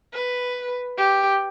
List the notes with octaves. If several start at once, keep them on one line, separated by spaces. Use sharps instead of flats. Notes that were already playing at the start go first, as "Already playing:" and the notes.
B4
G4